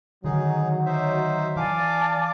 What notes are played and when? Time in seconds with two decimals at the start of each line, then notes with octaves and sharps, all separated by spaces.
0.24 D3 D#3 F#3 D#4 G#4
0.86 D#4 C5 E5
1.56 E3 D5 F5 G#5 A5 D6